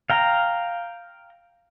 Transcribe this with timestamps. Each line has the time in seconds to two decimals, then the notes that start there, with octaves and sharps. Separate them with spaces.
0.10 F5 G5 A#5